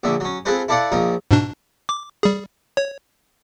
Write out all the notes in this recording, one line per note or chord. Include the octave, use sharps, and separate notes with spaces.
A#1 A#2 D3 E5
F#3 C#4
C4 F4 G#4 A4 B4 C5
E4 A4 D5 F5 F#5
A#1 F3 D#4 A#4
G#2 B2 D4
D6
G3 G#4
C#5